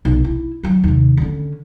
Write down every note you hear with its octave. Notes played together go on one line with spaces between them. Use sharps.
B1
E4
D#3 F#3
D#2 C3
D3 C#4